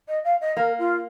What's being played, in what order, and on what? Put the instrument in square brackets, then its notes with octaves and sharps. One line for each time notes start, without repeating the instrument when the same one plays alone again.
[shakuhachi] D#5
F5
D#5
[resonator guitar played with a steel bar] A#3 [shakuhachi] A#4
[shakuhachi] F4